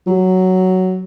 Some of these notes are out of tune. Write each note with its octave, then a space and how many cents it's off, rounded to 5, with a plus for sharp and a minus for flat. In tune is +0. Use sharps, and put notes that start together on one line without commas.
F#3 +5